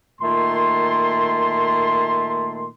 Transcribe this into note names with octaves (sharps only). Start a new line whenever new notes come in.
A#2 D#3 A3 C6